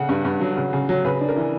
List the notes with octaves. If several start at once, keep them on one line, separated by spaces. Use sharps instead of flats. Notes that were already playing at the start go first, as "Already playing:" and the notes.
Already playing: C#3 F#5
G2
G2
F#3
C#3
C#3
F#3
C#3 B4
D4
A#4
E3